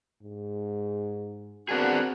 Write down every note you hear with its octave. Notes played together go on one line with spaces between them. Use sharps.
G#2
B3 C4 D4 F#4 G#4 A#4